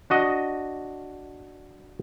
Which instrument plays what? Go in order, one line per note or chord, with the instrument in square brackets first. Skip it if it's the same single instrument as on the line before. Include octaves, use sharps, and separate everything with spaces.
[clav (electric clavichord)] D4 F#4 D#5